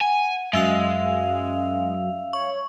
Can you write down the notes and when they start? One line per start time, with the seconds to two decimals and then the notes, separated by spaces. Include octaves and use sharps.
0.01 F#5 G#5
0.53 F#2 G#3 E5 F5 E6 F7
2.33 C#5 C#6